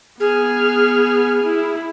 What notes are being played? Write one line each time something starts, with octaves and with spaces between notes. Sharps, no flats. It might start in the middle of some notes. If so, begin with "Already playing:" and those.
B3 G#4 F6
E4